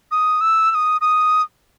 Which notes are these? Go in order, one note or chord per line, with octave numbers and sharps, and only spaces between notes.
D#6
E6
E6
D#6
D#6